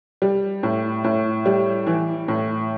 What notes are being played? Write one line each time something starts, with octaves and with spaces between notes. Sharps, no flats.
G3
A2
A2
G3
E3
A2